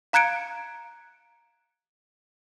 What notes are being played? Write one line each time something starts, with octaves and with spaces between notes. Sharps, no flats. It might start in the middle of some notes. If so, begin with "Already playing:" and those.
F5 A#5 F#6 G#6 C#7 D7